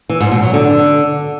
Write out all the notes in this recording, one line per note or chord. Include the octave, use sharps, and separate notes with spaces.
E3
G#2
B2
F#3
D3